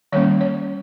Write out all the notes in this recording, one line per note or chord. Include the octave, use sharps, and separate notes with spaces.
D#3 G3 A#3 C#4 C#5
C#5